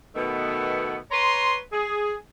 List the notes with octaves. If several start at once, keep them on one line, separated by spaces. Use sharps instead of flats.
B2 D#3 A3 B3
B4 C#5 A#5 C6
G#4